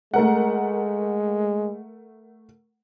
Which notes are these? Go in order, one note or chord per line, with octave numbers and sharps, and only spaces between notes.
G#3 A3 A#4 F#5